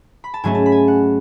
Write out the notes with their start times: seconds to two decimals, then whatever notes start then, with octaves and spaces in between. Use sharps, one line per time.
0.24 B5
0.34 A5
0.44 G#2 F#3 A3 C#4 G#5
0.55 A5
0.66 B5
0.72 G#5 A5
0.88 F#5